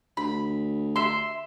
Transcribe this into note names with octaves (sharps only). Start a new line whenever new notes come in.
D2 B5
E5 C6